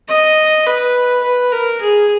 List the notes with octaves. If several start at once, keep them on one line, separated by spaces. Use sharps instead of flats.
D#5
B4
B4
A#4
G#4